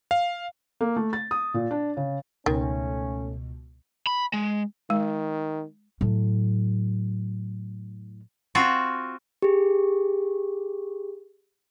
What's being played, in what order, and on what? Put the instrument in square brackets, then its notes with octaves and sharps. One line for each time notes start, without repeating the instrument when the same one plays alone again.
[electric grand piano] F5
[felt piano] A#3
A3
A6
D#6
A#2
D4
C#3
[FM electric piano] C#2 B2 [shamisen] D#3 [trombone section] A3 C#4
[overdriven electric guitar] B5
G#3
[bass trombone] D#3 [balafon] G#3
[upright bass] A2 F#3
[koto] C4 F4 F#4
[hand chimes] G4 G#4